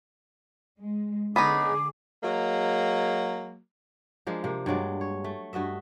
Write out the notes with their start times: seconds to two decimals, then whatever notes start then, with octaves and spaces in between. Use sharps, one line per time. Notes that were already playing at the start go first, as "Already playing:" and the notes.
0.80 G#3
1.36 D3 B3 C#4 D#4 G#4 D6
2.22 F#3 G#3 A#3
4.27 F3 G#3 A#3 D4
4.44 C3 A#3
4.66 G2 F#3 G#3 D5
5.01 C#5
5.24 A3
5.53 G2 F#4 D#5 E5